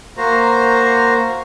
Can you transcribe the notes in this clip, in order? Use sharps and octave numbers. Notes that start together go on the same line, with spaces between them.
A#3 F#4 C5 A#5